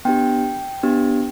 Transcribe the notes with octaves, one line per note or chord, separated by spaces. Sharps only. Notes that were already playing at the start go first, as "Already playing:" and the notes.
B3 D4 G4 G5
B3 D4 G4